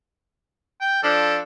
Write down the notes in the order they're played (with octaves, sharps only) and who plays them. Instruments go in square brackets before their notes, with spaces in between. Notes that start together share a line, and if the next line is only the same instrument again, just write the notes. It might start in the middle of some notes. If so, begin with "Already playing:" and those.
[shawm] G5
[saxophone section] F3 D4 [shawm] A4